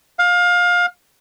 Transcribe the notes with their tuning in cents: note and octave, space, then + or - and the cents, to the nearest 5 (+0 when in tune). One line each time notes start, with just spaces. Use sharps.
F5 +25